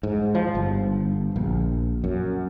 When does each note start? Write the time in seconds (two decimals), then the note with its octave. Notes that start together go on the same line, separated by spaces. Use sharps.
0.03 G#2
0.35 F3
0.55 G1
1.36 A#1
2.04 F#2